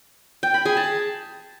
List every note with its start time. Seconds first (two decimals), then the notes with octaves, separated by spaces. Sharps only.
0.43 G5
0.54 B5
0.65 G#4
0.77 A5